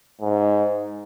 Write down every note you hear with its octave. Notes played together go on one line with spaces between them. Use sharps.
G#2